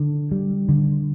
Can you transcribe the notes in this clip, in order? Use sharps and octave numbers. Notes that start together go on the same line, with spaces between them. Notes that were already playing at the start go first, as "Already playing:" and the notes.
Already playing: D3
G3
D3